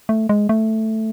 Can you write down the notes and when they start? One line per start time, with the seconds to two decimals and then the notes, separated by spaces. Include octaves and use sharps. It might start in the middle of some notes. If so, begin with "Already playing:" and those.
0.09 A3
0.29 G#3
0.49 A3